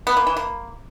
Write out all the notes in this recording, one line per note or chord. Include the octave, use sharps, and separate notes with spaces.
B3
A#3
E3
A#3